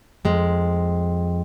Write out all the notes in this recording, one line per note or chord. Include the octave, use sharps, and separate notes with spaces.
F2 G#3